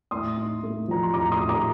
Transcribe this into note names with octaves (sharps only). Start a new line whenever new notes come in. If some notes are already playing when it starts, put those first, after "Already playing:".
A2 C6 D#6
D#4
A3
F3 A#5
C6
A2 A#5 D6
C6 D#6
D#4
A#5 D6